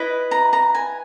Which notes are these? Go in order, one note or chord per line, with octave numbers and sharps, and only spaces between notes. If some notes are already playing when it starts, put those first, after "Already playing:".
Already playing: E4 B4 D#5
A#5
A#5
G#5